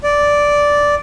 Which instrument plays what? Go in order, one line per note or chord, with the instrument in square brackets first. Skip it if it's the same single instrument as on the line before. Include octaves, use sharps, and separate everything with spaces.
[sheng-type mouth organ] D5